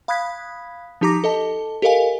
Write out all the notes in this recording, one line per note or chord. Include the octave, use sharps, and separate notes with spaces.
F5 B5 D#6 F#6 G#6 B6
F3 D#4 G4 A#5 D6 A#6
A4 D#5 A5
G4 A4 A#4 D#5 F5 G#5